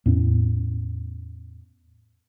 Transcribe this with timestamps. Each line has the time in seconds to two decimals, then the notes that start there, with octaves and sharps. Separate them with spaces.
0.06 E2 A2 C#4